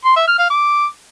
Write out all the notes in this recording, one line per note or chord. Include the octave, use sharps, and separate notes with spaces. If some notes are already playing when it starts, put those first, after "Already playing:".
C6
E5
F6
F5
D6